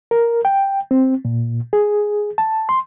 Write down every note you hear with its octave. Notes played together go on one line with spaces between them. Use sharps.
A#4
G5
C4
A#2
G#4
A5
C6